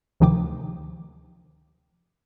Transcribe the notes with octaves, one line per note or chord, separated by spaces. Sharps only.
D2 C3 D#3 F3 G5 D6